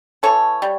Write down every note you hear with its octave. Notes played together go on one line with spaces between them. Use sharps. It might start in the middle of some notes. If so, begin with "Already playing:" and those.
E3 A4 C#5
G3